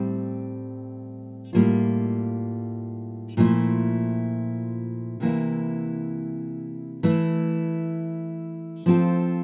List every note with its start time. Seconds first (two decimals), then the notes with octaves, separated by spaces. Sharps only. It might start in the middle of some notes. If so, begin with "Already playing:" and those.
Already playing: A2 G3 C4
1.53 A2 G3 A#3 F4
3.37 A#2 F3 A3 E4
5.20 C3 E3 A#3 E4
7.03 E3 A3 E4
8.86 F3 C4 F4 A4